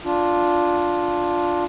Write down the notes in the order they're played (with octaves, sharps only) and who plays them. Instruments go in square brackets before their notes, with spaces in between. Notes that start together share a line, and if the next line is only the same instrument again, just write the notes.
[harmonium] D4 F4